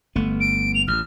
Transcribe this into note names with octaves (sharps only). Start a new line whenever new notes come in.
G1 A3 B3
D7
F7
A1 F6